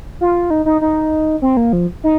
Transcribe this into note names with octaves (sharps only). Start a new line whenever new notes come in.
F4
D#4
D#4
D#4
C4
A#3
F3
D#4